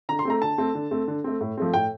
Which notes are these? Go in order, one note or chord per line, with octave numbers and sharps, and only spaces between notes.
D3 A#5
C6
A3 C4 A#5
D3 A5
A3 C4
D3
A3 C4
D3
A3 C4
A2
F3 A3 C4
A2 G5